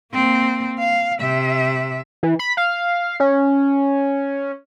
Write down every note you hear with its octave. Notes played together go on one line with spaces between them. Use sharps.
A#3 C4
F5
C3 E5
E3
B5
F5
C#4